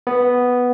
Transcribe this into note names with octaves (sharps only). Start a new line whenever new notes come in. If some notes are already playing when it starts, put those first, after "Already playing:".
B3